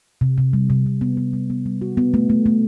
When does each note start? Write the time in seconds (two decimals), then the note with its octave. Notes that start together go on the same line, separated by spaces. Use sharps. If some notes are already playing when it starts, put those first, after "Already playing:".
0.21 C3
0.38 C3
0.53 G3
0.70 C3
0.86 C3
1.01 B3
1.17 B3
1.33 G3
1.50 B3
1.66 G3
1.81 F#4
1.97 B3
2.14 A3
2.30 A3
2.46 A3